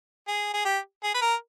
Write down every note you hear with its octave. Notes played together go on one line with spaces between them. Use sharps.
G#4
G#4
G4
G#4
B4
A#4